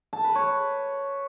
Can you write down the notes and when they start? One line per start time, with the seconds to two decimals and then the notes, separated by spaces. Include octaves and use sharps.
0.13 A5
0.24 B4
0.35 C#5